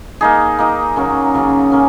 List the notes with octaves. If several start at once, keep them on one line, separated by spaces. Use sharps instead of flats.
A#3 D#4 G#4
A#3 D#4 G#4
C#3 F#3 A#3 C#4
C#3 F#3 A#3 C#4
A#3 C#4